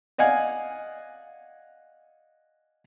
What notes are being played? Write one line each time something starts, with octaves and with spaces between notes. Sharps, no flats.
D5 D#5 F5 F#5 G#5